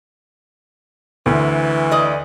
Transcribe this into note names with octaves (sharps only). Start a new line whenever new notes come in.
D2 E3
D5 D#5